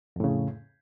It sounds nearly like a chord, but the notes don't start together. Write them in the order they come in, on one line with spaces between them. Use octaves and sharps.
F2 A2 C#3